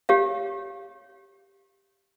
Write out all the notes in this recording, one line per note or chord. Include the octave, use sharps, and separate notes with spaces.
G4 C#5 F5